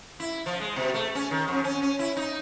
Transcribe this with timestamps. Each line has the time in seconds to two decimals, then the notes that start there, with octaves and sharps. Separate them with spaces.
0.20 E4
0.46 F3
0.60 G#3
0.76 B2
0.94 A3
1.15 C#4
1.31 D#3
1.48 F2
1.64 C#4
1.82 C#4
1.99 E4
2.17 D#4